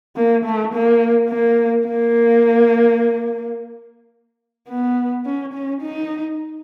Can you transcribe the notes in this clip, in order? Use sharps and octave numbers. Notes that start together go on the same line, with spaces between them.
A#3
A3
A#3
A#3
A#3
B3
C#4
C#4
D#4